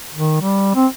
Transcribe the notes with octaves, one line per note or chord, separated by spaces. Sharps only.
D#3
G3
C4